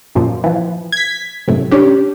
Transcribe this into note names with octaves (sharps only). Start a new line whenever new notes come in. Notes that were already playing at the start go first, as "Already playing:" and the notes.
F#2 A#2 F3
E3 F3
G#6 B6
G#1 F#2 A2 C3
C#4 D4 G4